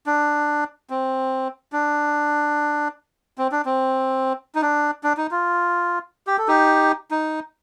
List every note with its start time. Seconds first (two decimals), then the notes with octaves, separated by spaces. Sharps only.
0.06 D4
0.90 C4
1.72 D4
3.38 C4
3.52 D4
3.65 C4
4.55 D#4
4.62 D4
5.03 D4
5.17 D#4
5.31 F4
6.27 G4
6.38 A4
6.48 D#4 G4
7.11 D#4